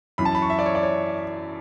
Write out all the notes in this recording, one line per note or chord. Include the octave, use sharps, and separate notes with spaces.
F#2 E3 B5
A5
B5
C#6
E5
D5
C#5
D5
C#5